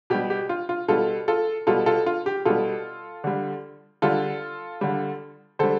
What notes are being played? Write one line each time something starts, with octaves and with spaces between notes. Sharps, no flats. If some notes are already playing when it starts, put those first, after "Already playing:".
B2 G3 G4
G4
F4
F4
B2 G3 F4 A4
F4 A4
B2 G3 F4 A4
F4 A4
F4
G4
B2 G3 F4 A4
D3 G3
D3 G3 F4 A4
D3 G3
D3 G3 A4 C5